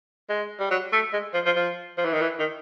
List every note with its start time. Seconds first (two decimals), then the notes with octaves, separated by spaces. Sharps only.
0.30 G#3
0.60 G3
0.71 F#3
0.93 A3
1.13 G#3
1.34 F3
1.46 F3
1.56 F3
1.98 F3
2.05 E3
2.13 D#3
2.22 E3
2.40 D#3